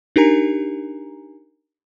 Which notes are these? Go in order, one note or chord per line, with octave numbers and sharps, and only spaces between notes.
D4 D#4 G4 A#4 G#5 A#5